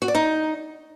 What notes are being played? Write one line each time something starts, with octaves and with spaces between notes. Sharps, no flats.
F#4
D5
D#4